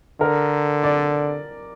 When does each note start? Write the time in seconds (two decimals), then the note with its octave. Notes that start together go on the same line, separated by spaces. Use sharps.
0.20 D3 A#4
0.84 D5